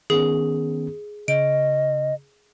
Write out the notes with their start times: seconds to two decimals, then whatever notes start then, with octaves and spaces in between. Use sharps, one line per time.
0.10 D#3 B3 C#4 G#4
1.28 C#3 D#5 D7